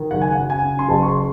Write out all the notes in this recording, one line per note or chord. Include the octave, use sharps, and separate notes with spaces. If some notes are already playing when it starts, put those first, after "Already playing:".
Already playing: D#3
F#1 F#5
G#5
F#2 F#5
G#5
C#3
C6
F#1 A5
C#6
C6